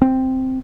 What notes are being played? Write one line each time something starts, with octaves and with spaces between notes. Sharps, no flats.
C4